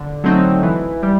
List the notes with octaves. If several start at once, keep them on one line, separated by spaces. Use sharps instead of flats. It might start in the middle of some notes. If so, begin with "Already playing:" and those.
Already playing: D3
F#3 A3 C4 D#4
E3
G3